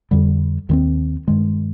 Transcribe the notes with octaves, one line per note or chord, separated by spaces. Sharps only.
F2 D3 G3
D#2 D#3 G#3 C4
G2 D#3 G#3